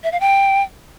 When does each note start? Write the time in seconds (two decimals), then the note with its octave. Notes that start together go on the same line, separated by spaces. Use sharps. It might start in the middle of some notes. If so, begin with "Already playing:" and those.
0.04 E5
0.12 F5
0.21 G5